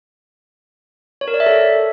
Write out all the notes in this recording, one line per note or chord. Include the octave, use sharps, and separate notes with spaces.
C#5
A#4
D5
E5
A4